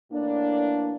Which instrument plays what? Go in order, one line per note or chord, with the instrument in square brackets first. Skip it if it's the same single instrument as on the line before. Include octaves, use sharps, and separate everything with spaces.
[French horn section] A2 E3 A#3 D4